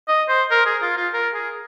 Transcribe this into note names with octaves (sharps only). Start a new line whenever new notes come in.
D#5
C5
A#4
G#4
F4
F4
A#4
G#4